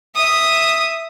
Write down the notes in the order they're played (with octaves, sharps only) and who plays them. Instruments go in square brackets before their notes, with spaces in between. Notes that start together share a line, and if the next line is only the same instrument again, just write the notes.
[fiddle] E5 D#6